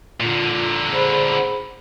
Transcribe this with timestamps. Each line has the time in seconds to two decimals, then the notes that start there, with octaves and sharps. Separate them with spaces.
0.20 A#2 D3 F4
0.91 G#4 C5 B5